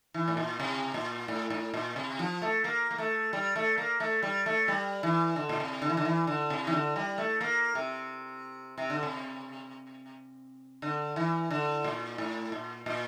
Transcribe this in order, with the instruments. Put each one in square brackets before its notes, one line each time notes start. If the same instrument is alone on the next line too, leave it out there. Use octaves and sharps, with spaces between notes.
[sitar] E3
A2
A#2
C3
A#2
A2
A2
A#2
C3
F3
A3
A#3
A#3
A3
G3
A3
A#3
A3
G3
A3
G3
E3
D3
A#2
C3
D3
E3
D3
E3
D3
C3
E3
D3
G3
A3
A#3
C3
C3
D3
C3
D3
E3
D3
A#2
A2
A#2
A#2